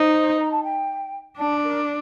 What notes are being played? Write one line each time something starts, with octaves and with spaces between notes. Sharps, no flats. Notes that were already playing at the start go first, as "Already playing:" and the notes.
Already playing: D#4 C5
A#5
A5
G5
D4 A5
A#4